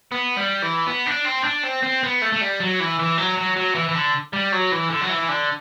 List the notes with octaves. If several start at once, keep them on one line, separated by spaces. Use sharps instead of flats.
B3
G3
E3
B3
D4
C4
D4
C4
C4
B3
A3
A3
G3
F#3
E3
E3
F#3
F#3
F#3
E3
E3
D3
G3
F#3
E3
D3
F#3
E3
D3